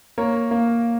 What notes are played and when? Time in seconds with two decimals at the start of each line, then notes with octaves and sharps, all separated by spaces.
0.18 A#3 A#4 C#5
0.51 A#3